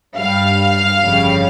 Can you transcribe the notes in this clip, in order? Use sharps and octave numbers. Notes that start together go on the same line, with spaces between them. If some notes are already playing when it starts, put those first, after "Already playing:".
G2 G3 F5
G1 F2 C#3 G3